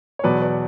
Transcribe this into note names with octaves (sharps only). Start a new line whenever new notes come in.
C#5
E2 B2 F#3 B4 D5
B4 D5